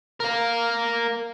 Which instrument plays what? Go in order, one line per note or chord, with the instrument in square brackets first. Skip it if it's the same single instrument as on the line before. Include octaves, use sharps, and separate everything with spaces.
[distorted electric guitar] A#4 F5